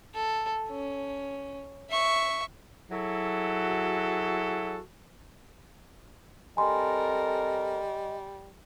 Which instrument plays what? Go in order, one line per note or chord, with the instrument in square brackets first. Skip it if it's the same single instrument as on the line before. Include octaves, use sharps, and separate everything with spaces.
[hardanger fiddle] A4
C#4
E5 C#6
[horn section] F#3 E4 F#4 G#4 A4
[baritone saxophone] G3 [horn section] C4 A4 A#4 [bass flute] D#5 [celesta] G#5 A#5 C6